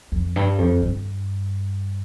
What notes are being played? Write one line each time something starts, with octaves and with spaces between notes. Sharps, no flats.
F2
G2
F2
G2